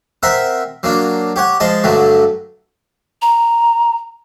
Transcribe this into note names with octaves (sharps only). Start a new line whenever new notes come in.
C4 A#4 E5 F#5
F#3 A#3 D4
G4 C#5 F#5
F3 G#3 D#5 A5
G2 D3 F#3 A3
A#5